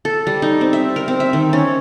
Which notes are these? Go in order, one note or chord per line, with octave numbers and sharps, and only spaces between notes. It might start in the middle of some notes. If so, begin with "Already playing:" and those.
A4
G3
D#4
C4
E5
A#4
C4
E5
D#3
C#4